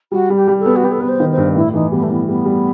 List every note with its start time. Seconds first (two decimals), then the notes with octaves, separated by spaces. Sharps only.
0.12 G3 F#4
0.30 G3
0.35 G4
0.48 G3
0.59 A4
0.66 B3
0.75 F#4
0.84 B3 G4
0.91 A4
1.00 B3 B4
1.08 C5
1.20 D#3
1.31 C5
1.37 G2
1.56 A2 E4
1.74 E3 D#4
1.92 G3 B3
2.03 A3
2.10 A2 B3
2.28 G3 B3
2.45 G3